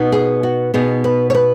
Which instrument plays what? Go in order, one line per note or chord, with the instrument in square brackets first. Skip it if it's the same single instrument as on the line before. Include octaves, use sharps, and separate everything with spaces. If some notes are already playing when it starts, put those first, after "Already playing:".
Already playing: [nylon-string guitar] B2 B3 D#4
G#4
F#4
B2 B3 D#4 G#4
B4
C#5
B4